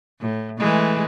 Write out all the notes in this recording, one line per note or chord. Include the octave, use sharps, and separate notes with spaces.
A2
E3 G#3 A3